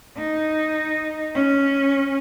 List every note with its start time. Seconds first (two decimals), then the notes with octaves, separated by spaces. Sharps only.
0.17 D#4
1.35 C#4